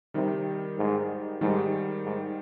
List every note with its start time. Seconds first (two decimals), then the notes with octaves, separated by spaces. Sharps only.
0.14 C3 D#3 G3
0.78 G#2
1.41 G#2 D#3 G3
2.04 G#2